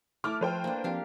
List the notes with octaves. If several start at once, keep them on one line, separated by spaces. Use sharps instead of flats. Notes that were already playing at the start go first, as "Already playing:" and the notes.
A3 E4 D6 F6
F3 B4 C5 G5
A#3 D4
F3 C4 D4 G4 F5